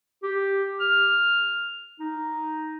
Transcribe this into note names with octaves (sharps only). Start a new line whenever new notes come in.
G4
F6
D#4